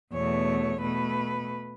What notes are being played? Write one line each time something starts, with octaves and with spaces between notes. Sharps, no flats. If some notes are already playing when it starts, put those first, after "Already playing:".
E2 B2 A3 C#5
B2 A3 B4